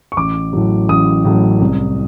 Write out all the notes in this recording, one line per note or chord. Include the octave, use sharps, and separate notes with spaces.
C#6
A1 D6
A2 F#3
A1 D#6
A2 F#3
C2